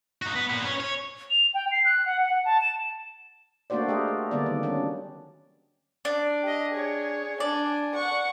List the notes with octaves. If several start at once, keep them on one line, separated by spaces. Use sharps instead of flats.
D#4 F#4
B3
A#2 B3
C#4
C#5
F7
G5
C7
F#6
F#5
F#5
A5
E7
A3 A#3 D4 F#4 C5 D5
G#3 G4 A#4 D#5
A3
D3 G3 A#3 B3 D5
D#3
F#3 C#4 D4
D4
G4 D#5
G#4 C#5
D4 D5 G#5
F#5 C#6